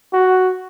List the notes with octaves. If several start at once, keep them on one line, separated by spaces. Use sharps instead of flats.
F#4